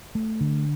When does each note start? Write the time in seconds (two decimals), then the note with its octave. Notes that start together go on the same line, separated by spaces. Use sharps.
0.15 A3
0.41 D3